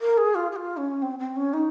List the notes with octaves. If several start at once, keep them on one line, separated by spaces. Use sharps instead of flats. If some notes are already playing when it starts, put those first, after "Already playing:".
A#4
G#4
F4
G#4
F4
C#4
C4
C4
C#4
D#4